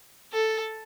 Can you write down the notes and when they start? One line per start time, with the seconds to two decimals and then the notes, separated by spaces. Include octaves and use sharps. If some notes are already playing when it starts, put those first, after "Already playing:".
0.32 A4